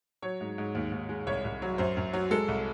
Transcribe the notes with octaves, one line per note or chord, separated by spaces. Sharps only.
F#3 C#5
G#2
G#2
D#2
D#2
G#3
C2 C#5
C2
F#3
F#2 C5
F#2
F#3
G#3 A4
C2